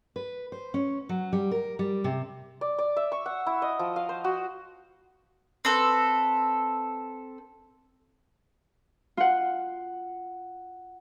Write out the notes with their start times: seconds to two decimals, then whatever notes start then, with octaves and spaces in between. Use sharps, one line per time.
0.16 B4
0.52 C5
0.74 C#4
1.09 F#3
1.33 G3
1.51 A#4
1.79 G3
2.04 C3
2.61 D5
2.78 D5
2.97 E5
3.12 C#6
3.26 F#5
3.46 E4
3.62 D#5
3.79 F3
3.96 F5
4.09 C5
4.24 F#4
5.65 C4 A4 B4
9.17 F4 F#5